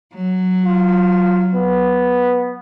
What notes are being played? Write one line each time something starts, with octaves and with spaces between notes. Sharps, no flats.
F#3
F4
B3